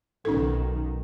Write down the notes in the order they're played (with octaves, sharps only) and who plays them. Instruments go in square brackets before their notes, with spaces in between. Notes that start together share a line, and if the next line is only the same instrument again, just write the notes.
[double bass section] B1 D#3 [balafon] C#4 D#4 A4